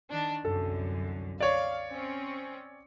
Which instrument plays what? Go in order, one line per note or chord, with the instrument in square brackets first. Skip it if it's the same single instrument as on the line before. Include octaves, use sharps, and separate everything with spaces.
[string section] D#3 D4
[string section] C2 F#2 D3 [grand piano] A4
[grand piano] C#5 D5 [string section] F5
[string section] C4 C#4